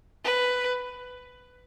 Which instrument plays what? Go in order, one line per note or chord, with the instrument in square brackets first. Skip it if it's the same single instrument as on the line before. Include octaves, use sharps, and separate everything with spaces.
[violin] B4